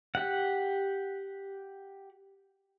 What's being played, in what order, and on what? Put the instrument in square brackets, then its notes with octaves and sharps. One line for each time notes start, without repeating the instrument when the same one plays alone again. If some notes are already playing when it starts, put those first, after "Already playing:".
[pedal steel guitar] G4 F#5